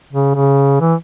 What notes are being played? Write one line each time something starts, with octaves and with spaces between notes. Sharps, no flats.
C#3
C#3
E3